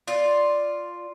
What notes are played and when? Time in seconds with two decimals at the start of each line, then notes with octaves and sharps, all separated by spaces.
0.07 F4 D5